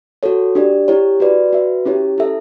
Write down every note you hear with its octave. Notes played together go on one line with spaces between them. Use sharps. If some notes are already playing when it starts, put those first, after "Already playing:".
F#4 A4 C#5
D4 G4 D5
E4 G4 C#5
F#4 B4 D5
F#4 B4 E5
C#4 E4 G4 C#5
E4 A4 E5